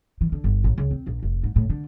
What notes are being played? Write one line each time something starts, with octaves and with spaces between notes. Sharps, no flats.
E3
D3
G1
A1
C#2
C4
A#1
F1
G#2
A2
D3